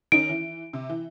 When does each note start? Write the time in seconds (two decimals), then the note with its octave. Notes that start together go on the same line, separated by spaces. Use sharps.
0.12 D#3 C#4 D#4 D7
0.30 E3
0.73 C3
0.89 E3